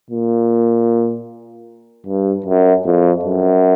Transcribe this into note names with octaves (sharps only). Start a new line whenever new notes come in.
A#2
G2
F#2
F2
F#2